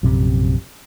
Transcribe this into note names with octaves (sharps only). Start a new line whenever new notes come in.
A#1 F#2 C3